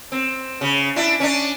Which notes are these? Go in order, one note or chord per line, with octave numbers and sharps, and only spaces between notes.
C4
C#3
D4 E4
C#4 D4